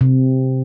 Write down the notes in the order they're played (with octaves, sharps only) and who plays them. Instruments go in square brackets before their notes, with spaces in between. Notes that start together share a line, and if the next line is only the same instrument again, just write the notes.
[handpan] C3